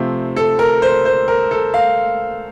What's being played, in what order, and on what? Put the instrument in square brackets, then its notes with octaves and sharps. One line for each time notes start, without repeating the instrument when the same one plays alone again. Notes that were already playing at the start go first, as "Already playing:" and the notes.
Already playing: [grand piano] C3 F3 A3 C4
A4
A#4
C5
C5
A#4
A4
F5